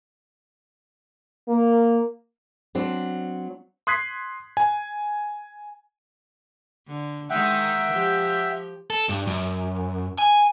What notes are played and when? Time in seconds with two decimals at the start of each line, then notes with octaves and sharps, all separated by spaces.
1.48 A#3
2.75 F#3 C4 D4
3.87 C6 D#6 F#6 G#6 B6 C7
4.57 G#5
6.87 D3
7.30 D#3 G#3 D#4 E5 F#5 G5
7.92 F3 G4
8.90 A4
9.09 G2
9.27 F#2
10.18 G#5